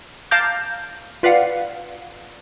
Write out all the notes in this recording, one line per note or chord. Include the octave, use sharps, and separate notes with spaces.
F5 A5 A#5 D6 G6
F4 B4 D5 F5 F#5